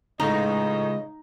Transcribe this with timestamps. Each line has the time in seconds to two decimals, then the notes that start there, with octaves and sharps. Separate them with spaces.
0.20 A2 C#3 G#3 D#4 D#5 A#5